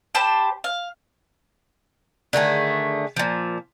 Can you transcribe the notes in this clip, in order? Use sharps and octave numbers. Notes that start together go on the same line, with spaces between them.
G4 C5 A5 B5
F5
D3 D#3 A3 G#4
A#2 F3